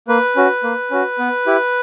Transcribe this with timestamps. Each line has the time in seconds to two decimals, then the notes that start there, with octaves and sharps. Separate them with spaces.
0.08 A#3 B4
0.36 C#4 F#4
0.63 A#3
0.91 C#4 F#4
1.19 B3
1.46 E4 G4